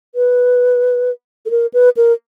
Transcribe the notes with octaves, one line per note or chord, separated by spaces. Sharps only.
B4
A4
A#4
B4
A#4